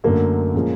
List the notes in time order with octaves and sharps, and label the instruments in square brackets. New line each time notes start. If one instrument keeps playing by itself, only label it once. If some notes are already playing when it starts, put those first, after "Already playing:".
[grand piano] F#2 D3 F#3 A3 [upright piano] A#3
[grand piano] A#2 F3 G#3 C#4